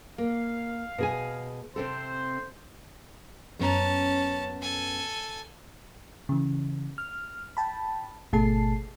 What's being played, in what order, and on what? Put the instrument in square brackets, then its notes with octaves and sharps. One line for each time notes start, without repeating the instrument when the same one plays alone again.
[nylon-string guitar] A#3 [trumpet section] F5
[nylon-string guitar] B2 G#4 G#5
[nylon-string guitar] C3 C4 A4 [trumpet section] C5
[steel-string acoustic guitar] F#2 B3 A#5 [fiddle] C#4 A5
[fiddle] A4 G#5
[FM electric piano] C#3 E3
F6
G5 A5 B5
G#1 B2 A3 G#4 A5 C7